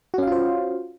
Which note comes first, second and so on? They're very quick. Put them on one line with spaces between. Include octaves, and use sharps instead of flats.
F#4 C#4 F5 F4 C5